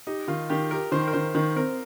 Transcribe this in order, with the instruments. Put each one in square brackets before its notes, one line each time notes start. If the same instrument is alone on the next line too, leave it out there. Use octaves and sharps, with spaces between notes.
[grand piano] D#4 [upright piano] G4
[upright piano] D#3 [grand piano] F4
[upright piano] D#3 [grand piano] G4
[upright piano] G4 [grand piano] A#4
[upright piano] D#3 [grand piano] C5
[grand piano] A#4
[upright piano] D#3 [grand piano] C5
[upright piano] D#3
[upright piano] C4 [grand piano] A#4